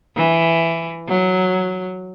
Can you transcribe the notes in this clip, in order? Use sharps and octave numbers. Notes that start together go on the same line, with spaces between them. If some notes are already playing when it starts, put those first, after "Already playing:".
E3
F#3